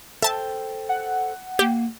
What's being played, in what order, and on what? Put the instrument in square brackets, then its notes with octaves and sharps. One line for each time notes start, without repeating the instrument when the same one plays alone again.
[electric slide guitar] A4 C5 G5 [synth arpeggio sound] E5 A5
[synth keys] F#5
[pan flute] A#3 [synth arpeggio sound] G4